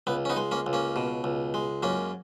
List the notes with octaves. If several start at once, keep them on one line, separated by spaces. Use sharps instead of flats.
C#2 B3
C#4
B3 D#4
G#3
A#3 C#4
C#2
A#3 C#4
B2
C#2
G#3
F#2 A#3 C#4